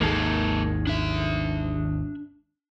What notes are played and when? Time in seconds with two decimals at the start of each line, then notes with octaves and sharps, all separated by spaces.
0.01 G#1 D#2 D#3 G#3 A#3 A4
0.87 D4 E5